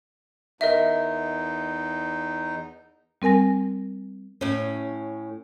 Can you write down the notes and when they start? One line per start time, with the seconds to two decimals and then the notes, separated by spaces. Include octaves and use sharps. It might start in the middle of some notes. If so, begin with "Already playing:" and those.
0.61 E2 D#4 A#4 D#5 E5
3.22 G3 C4 A#4 G#5 A#6
4.41 A2 C#4